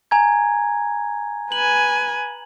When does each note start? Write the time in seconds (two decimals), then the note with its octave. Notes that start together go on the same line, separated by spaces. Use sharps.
0.11 G#5 A#5 G#6
1.52 B4 G#5 F#7